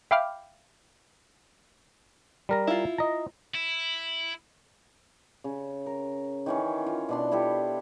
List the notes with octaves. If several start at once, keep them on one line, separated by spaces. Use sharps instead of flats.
E5 F5 G5 B5 D6 F6
G3 A#4 A#5
E4 F4
D#5 A#5
E4
C#3
A#4
D#3 E3 C#4
F4
B2 D4 C6
E4 F4 G4 A4